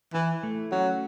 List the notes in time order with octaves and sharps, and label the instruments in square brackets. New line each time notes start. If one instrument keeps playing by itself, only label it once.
[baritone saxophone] E3 [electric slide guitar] E4
[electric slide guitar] A3
[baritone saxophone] F#3 [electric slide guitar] C#4